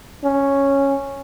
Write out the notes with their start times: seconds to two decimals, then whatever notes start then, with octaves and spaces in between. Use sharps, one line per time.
0.24 C#4